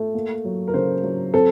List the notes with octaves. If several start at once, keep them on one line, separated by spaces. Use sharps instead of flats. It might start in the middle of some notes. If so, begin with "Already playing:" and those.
Already playing: A3
A#3
F#3
A#4
C#3 C5
F#3
C4 A4